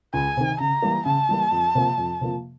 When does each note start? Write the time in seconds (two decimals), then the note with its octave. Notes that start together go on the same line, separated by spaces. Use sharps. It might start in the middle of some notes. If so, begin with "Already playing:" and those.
0.14 C#2 G#5
0.37 C3 D#3
0.60 C#3 A#5
0.82 E3 G3 A#3
1.05 C#3 A5
1.29 E3 G3 A#3
1.52 F2
1.75 C3 F3 A#3
1.98 F2
2.21 C3 F3 A#3